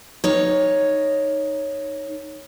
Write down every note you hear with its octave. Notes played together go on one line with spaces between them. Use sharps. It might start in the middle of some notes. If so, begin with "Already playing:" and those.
D#4 C#5